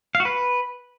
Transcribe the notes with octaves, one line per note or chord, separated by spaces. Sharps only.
F5
F#4
B4